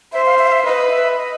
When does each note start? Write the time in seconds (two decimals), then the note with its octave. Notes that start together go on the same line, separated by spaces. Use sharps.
0.13 C5 E5
0.26 F5
0.39 E5
0.47 F5
0.52 E5
0.65 B4 D#5
0.90 E5
1.16 D#5